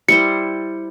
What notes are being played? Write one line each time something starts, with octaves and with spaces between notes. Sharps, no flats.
G3 E4 C5 C#7